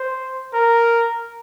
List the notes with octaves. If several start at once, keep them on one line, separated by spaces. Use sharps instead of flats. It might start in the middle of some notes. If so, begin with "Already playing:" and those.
Already playing: C5
A#4